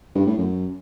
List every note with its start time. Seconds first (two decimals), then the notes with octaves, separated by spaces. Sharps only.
0.15 G2
0.26 A2
0.38 F#2